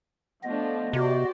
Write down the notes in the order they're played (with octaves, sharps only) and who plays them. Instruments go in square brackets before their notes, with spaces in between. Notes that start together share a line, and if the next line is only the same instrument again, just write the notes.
[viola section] F3 A3 D4 [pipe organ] B3 D#5
[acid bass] C3 [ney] F#4 [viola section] G4 C5 D5